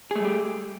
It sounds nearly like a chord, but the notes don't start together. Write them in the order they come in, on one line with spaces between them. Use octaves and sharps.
G#4 A3 G3 G4